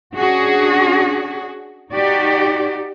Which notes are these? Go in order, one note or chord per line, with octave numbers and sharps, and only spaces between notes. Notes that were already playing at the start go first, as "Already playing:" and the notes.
C#4 D4 F#4 G#4
D#4 F#4 G4 D5